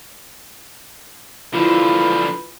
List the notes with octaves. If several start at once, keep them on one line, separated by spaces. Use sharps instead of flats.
D3 F3 E4 F4 B4